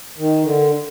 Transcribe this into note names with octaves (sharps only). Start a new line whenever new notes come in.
D#3
D3